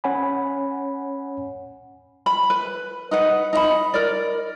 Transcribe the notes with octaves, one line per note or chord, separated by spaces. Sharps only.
C#4 C#5 F#5 G#5 B5
B5
B4
D#4 B4 F#5
D#4 E5 B5
A#4 D5